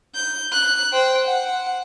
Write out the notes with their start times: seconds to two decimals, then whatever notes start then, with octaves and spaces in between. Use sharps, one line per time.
0.15 G6
0.52 F#6
0.93 C5 G5
1.27 F#5